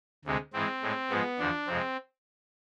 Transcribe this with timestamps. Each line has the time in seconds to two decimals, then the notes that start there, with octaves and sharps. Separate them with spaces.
0.25 D2 C3 G#3
0.53 G#2 E3 G#3 C4
0.82 A2 G#3
1.10 G#2 F3 G#3 B3
1.38 E2 D3 F3 D4
1.67 F2 C3 G#3 C4